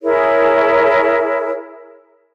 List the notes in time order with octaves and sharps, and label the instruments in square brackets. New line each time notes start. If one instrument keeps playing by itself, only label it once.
[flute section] E4 G#4 A#4 C#5